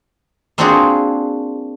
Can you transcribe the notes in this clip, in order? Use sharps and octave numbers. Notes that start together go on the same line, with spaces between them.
A#3 C4 D4 F4 F#4 G#4